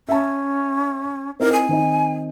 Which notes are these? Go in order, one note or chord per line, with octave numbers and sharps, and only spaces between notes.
C#4 E5 A5
C4 D#4 E4 A#4
G#5
D#3 C4 D#4